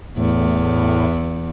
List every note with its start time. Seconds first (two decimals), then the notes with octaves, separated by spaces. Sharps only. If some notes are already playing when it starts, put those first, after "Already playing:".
0.17 E2 A2